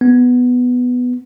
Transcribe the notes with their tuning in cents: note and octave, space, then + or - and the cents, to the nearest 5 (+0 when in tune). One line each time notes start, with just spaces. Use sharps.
B3 +5